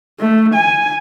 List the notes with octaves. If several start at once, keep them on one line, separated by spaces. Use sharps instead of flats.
A3
G#5